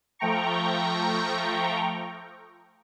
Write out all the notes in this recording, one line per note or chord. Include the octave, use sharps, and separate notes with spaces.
F3 A3 G5 A#5 C#6